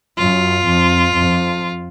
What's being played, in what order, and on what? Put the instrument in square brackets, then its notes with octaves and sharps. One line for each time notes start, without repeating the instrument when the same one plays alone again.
[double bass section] F#2 [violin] F4
[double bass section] F2
F2